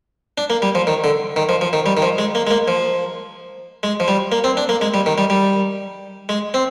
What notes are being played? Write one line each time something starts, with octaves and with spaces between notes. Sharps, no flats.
D4
A#3
G3
F3
D#3
D3
D#3
F3
F3
D#3
G3
D#3
F3
G#3
A#3
G#3
A#3
F3
G#3
F3
G3
A#3
C4
D4
A#3
G#3
G3
D#3
G3
G3
G#3
C4